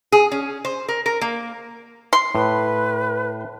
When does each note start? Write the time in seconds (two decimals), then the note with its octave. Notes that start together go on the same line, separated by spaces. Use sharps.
0.12 G#4
0.32 C#4
0.65 C5
0.88 A#4
1.06 A#4
1.21 A#3
2.13 C6
2.35 A2 B4